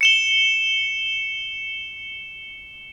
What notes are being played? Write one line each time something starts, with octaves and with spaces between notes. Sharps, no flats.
C#7 E7 G7